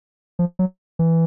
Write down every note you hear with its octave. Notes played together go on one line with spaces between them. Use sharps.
F3
F#3
E3